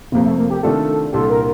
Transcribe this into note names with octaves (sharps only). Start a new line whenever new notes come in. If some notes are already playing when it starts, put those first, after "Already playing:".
F1 F2 C3 A#3
A3
A#3
G4
C3 D#3 A3 D4 F4 A4
C2 A#2 G3 D4 G4 A4
A#4